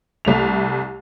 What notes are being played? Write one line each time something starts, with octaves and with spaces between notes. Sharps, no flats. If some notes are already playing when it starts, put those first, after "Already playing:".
C2 A3 F7